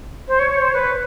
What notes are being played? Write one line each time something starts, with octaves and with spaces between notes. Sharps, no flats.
C5
C#5
C#5
C5
B4